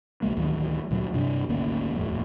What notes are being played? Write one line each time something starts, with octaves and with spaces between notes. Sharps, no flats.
C2 G#2 G#3 A#3
A1 D2 D#3 F#3
D2 A#2 F#3
G2 C3 D4
G#1 D2 A#3 C#4
D#1 F2 A2